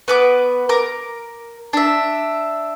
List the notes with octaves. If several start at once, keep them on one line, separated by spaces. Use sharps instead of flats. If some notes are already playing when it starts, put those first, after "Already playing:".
B3 B4 D6
A#4 D6
D4 E5